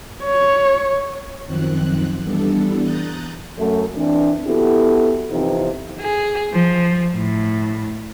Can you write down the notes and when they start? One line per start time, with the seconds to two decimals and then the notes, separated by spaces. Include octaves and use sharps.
0.23 C#5
1.46 F#2 D#3 F3 C4 F#6
2.23 E3 G3 B3 D4 A4
2.80 A#5 D#6 F#6 G6 A6
3.58 F#2 A3
3.96 E3 C4 D4
4.46 B3 E4 F#4 G4 A4
5.31 C3 E3 F3 B3 C4 D#4
6.00 G#4
6.52 F3
7.16 A2